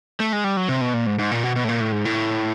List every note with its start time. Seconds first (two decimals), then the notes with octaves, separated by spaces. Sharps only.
0.20 A3
0.33 G#3
0.44 G3
0.57 F#3
0.69 C3
0.81 B2
0.94 A#2
1.06 G#2
1.19 G#2
1.31 A#2
1.43 B2
1.56 B2
1.64 A2
1.69 A#2
1.80 A2
1.92 G#2
2.05 A2